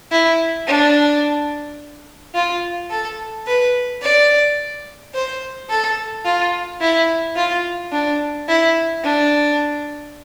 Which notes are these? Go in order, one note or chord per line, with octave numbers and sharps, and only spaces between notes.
E4
D4
F4
A4
B4
D5
C5
A4
F4
E4
F4
D4
E4
D4